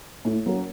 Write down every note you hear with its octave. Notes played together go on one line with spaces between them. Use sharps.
A2
F#3 A#3 C#4